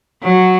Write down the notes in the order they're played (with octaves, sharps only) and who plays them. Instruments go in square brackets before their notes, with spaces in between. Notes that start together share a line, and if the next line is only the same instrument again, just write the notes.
[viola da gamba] F#3